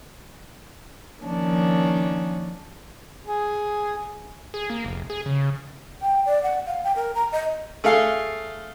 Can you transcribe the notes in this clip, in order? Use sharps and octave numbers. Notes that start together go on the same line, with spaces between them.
D#3 F3 A#3 C#4 D4
G#4
G#4
A#3
F1
G#4
C#3
G5
D5
F#5
F5
G5
A#4
A#5
D#5
A3 G#4 A4 F5